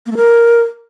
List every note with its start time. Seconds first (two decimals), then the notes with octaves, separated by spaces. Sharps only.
0.06 A#3
0.11 A3
0.17 A#4